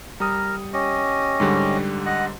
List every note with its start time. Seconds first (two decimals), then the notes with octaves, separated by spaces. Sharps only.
0.20 G3 A#4 A#5 D#6
0.73 C#4 G4 D#5
1.40 G#2 D3 G3
2.06 D#5 F#5